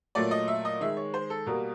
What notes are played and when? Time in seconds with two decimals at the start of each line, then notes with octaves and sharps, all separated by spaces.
0.15 A#2 F#3 A3 D5
0.31 D#5
0.48 E5
0.65 D#5
0.81 D#3 G#3 E5
0.97 C#5
1.14 C5
1.30 A4
1.46 B2 G3 A#3 A#4